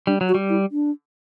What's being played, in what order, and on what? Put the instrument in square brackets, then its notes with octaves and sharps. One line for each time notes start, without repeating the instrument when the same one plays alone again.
[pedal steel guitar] G3 [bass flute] D4
[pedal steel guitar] F#3
[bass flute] F#4
[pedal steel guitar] G3
[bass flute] E4
D4